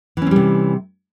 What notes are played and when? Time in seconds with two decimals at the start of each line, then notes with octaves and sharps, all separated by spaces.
0.17 E3
0.22 C#4
0.26 C4
0.31 G3
0.36 C3